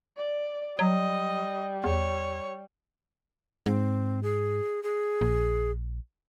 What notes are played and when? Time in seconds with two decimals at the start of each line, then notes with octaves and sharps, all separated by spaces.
0.17 D5
0.79 F#3 G3 D#5
1.84 E2 C#5
3.66 G#2 C4
4.23 G#4
4.83 G#4
5.21 A#1